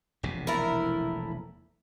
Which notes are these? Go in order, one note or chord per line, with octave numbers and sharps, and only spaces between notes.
E1 A#1 C3
A3 E4 A#4